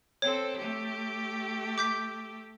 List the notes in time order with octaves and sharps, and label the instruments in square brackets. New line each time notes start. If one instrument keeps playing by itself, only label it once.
[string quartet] C4 A4 [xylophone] C#5
[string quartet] A3 G4
[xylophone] D6 G6 B6